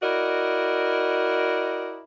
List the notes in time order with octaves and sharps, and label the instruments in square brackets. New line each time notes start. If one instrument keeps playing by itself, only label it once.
[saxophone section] E4 F#4 A#4 D5 D#5